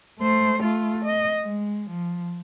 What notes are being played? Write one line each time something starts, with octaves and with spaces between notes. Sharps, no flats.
A3 C5
A3 F4
D#5
G#3
F3